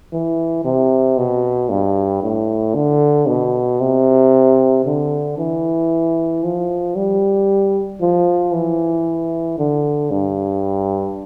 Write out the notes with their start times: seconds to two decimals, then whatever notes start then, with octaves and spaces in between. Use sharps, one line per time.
0.13 E3
0.64 C3
1.18 B2
1.70 G2
2.23 A2
2.75 D3
3.28 B2
3.80 C3
4.85 D3
5.38 E3
6.44 F3
6.96 G3
8.01 F3
8.54 E3
9.58 D3
10.11 G2